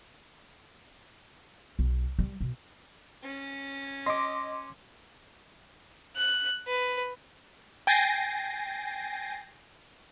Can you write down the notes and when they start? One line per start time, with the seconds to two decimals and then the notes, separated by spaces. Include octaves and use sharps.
1.79 B1
2.19 G3
2.41 B2
3.23 C#4
4.06 D#5 C6 D6
6.16 F#6
6.67 B4
7.87 G5 G#5 A6 A#6 C7